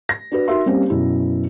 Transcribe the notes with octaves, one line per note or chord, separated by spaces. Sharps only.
A#6
D4 F#4 B4
D#4 F#4 A#4 E5 C6
G3 A#3 C4 C#4 G4
F#2 B2 E4